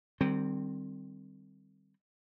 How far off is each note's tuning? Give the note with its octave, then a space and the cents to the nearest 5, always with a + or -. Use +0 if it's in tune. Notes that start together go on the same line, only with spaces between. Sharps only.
D#3 -40 G3 +0 C4 +0